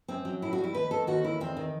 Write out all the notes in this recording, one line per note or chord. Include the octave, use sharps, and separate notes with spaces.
F#2 C4
F#3
A2 E4
F#4
G3
E4
D#2 B4
D#3 A4
D#2 F#4
D#3 E4
E2 C4
D#3